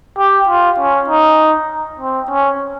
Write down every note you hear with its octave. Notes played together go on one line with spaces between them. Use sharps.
G4
F4
C#4
D#4
C4
C#4